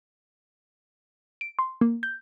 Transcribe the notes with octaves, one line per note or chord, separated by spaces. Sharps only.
D7
C6
A#3
G6